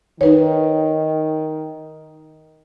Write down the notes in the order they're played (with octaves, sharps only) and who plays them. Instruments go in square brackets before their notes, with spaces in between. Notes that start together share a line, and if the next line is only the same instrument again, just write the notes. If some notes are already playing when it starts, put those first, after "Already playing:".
[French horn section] D#3 [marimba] D#4 B4 C#5